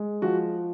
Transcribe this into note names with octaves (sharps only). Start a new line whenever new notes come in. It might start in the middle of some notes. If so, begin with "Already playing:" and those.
Already playing: G#3
F3 F#4